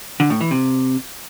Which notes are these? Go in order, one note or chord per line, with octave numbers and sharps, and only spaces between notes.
D3
A2
E3
C3